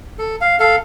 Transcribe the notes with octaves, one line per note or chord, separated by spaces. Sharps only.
A4
F5
A4 F5